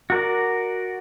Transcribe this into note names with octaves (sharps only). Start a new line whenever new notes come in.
F#4 A#4 D5